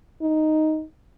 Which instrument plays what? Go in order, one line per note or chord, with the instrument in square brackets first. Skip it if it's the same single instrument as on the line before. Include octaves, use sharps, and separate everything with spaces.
[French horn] D#4